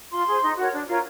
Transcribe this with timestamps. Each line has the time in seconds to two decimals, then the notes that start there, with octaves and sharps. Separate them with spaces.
0.12 F4 C6
0.27 G#4 C5
0.43 D#4
0.57 F#4 A#4 C#5
0.73 D4
0.88 F4 A#4 C#5